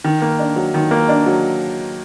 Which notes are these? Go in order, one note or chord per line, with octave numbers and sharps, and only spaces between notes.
D#3
A#3
D4
F#3
D#3
A#3
D4
F#3